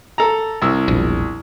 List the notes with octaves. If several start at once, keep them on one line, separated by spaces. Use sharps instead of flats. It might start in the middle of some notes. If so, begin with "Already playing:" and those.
A4 A#5
C2 E6
E1 A#1